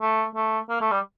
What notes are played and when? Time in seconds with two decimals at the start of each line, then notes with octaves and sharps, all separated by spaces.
0.01 A3
0.35 A3
0.69 A#3
0.81 A3
0.91 G3